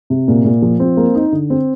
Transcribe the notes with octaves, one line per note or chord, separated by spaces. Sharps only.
C3
A#2
A#2
F3
C4
A#3
D#4
D3
C4